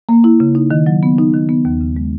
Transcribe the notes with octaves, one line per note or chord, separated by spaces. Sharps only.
A#3
E4
C#3
D#4
D#3
F#3
B3
D#4
D#3
B3
D#2
C#3
G#3